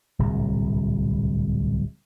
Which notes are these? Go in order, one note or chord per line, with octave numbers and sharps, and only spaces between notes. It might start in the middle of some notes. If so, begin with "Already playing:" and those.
D1 C2 A#2